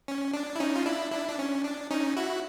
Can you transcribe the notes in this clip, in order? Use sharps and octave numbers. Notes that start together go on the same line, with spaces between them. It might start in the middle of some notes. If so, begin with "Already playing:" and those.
C#4
D4
E4
C#4 D#4
F4
D4 E4
D4 E4
D4
C#4
D4
C#4 D#4
E4 F#4